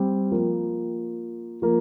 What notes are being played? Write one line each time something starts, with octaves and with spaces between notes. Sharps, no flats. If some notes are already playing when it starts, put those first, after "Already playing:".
Already playing: G3 C4
F3 A#3
F3 A#3